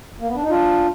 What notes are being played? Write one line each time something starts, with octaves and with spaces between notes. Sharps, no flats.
A#3
B3
D4
D#4
D4 F4